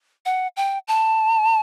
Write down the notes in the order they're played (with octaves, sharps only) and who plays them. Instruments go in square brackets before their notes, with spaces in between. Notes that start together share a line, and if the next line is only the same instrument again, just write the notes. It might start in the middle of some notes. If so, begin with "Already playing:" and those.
[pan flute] F#5
G5
A5